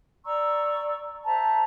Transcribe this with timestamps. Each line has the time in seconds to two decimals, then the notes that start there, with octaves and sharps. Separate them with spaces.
0.24 D5 A#5 C#6 E6
1.25 C5 E5 A5 A#5